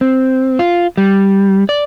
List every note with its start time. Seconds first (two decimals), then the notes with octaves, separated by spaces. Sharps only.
0.01 C4
0.59 F4
0.97 G3
1.69 D5